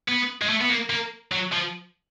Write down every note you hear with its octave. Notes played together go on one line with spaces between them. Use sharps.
B3
G#3
A3
B3
A#3
A#3
F#3
F3